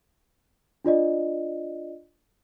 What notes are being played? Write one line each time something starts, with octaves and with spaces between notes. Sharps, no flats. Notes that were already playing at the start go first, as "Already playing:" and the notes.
D4 F4 D5 D#5